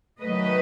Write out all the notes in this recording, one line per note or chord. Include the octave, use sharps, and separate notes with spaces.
D#3 F#3 A3 B4 D#5